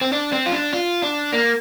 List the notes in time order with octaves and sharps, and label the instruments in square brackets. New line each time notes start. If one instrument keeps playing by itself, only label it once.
[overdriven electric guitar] C4
D4
C4
F4
D4
F4
D4
A#3